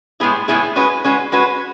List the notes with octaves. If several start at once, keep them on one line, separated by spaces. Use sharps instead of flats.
A2 G#3 B3 E4 G#4
A2 G#3 B3 E4 G#4
G#3 C#4 F#4 B4
G#3 C#4 F#4 B4
G#3 C#4 F#4 B4